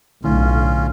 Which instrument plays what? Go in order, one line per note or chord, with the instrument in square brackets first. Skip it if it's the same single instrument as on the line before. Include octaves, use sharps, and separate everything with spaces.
[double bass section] B1 [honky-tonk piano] A2 [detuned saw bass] D3 [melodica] C#4 F4